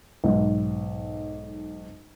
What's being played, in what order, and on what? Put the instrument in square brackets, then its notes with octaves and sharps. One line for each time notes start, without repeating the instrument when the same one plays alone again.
[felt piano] B1 G#2